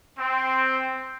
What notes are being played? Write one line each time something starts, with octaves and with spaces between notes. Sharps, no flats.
C4